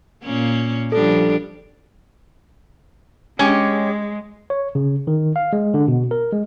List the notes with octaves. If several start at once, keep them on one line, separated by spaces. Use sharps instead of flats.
A#2 A#3 C#4
F3 G3 D4 A4
G#3 C#4 G4
C#5
C#3
D#3
F5
G#3
D3
B2
A#4
G#3